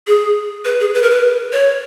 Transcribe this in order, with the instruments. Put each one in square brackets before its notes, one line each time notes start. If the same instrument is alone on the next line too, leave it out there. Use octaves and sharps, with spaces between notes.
[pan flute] G#4
B4
G#4
B4
A#4
B4
C#5